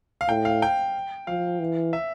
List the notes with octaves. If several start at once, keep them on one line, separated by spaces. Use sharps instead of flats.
F5
A2 G5
F5
G5
F3 F5
E3
E5